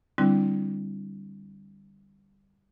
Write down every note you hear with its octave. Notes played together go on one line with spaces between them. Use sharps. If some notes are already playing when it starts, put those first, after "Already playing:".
D3 G3 C4 D4 E4